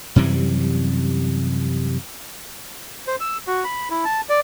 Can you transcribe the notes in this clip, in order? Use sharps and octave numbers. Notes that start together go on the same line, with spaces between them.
F#2 C3 E3 G3
C5
E6
F#4
B5
E4
A5
D5